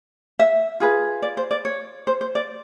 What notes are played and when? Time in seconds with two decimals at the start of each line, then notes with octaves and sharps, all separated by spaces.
0.39 E5
0.80 F4 G#4 B4
1.22 D5
1.37 C5
1.51 D5
1.65 C#5
2.07 C5
2.21 C5
2.35 D5